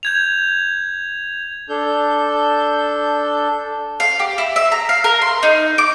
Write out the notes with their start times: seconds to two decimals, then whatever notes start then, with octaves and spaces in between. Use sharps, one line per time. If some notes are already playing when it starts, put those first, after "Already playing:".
0.03 G6 G#6 F7
1.69 D4 A4 G6
4.00 F5
4.19 G4
4.38 E4
4.56 E5
4.72 A#5
4.89 F5
5.04 A#4
5.21 C6
5.43 D#4
5.78 D6